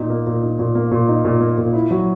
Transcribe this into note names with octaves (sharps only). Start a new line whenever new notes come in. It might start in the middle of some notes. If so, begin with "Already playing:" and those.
Already playing: A#2 D#4
A#3
A#2
D#4
A#2
A#3
A#2
D#4
A#2
A#3
A#2
E4
F#3